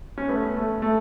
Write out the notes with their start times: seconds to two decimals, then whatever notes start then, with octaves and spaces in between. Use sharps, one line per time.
0.18 C#4
0.29 A3 B3
0.56 A3
0.82 A3